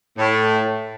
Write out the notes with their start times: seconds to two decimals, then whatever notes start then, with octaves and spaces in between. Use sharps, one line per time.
0.18 A2